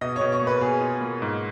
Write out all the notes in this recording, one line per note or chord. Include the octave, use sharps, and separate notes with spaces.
B2 D#5
C#5
B2
C#5
A#3
B4
B2 G#4
F4
A#3
G#2